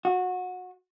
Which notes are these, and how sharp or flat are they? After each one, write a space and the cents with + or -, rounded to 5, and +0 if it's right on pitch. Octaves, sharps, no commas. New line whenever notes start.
F#4 -20